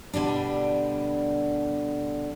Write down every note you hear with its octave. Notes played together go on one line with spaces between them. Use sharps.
B2 D3 G3 D4